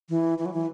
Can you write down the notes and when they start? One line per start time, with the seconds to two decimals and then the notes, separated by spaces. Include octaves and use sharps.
0.09 E3
0.38 E3
0.46 F#3
0.54 E3